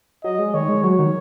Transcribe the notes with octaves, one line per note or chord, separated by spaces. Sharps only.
F#3 D#5
G#3
D#3 C#5
G#3
F#3 C#5
D#3